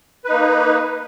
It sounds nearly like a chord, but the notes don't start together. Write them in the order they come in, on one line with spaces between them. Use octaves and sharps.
B4 D#4 A#3